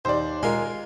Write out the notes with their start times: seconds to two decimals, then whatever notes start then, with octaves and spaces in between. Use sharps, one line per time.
0.05 D#2 C5 D5
0.43 G#3 F4 A#4 G#5 C6